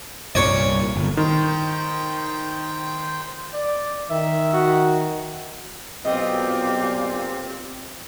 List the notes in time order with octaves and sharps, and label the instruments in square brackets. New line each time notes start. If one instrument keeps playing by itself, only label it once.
[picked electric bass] C2 G2 A#2 [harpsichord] C#5 D5
[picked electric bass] G1
[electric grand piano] D#3 [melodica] C5 G5
[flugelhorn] D5
[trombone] D#3 [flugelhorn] E5
[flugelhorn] F#4
[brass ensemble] B1 A#2 [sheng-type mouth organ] C4 [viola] F4 G4 [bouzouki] D#5